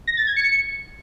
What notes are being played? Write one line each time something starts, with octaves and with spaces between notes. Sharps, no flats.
A#6
A6
G#6
C#7